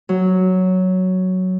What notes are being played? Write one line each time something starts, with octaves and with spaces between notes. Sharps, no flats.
F#3